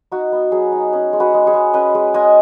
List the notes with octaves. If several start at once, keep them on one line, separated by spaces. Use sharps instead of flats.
D#4 F#4
B3
F#3 G#4
D#4
C#4 G#4
G#3
F#4 B4
G#3
G#4 C#5
G#3
C#4 B4 D#5
G#3
G#3 D#5 G#5